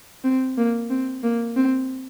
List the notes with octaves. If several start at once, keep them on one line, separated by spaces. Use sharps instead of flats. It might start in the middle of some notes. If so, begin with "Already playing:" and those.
C4
A#3
C4
A#3
C4